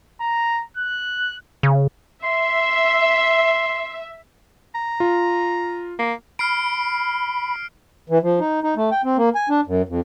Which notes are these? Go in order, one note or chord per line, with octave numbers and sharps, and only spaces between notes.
A#5
F#6
C#3
E5 C6
A#5
F4
A#3
B5 F6 C7 D7
E3
F3
D#4
D#4
A3
G5
C4
A#3
G#5
D4
F#2
F2